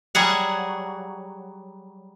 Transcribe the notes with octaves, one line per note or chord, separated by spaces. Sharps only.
F#3 G3 G#4 F#5